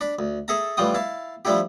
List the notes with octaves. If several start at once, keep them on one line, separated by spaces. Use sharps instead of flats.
D4 B5
D2
G#4 A4 E5 A5 A#5
A1 E3 G3 F4 G5 D#6
E4 F5 A5
F3 G3 A3 D4 E4 G4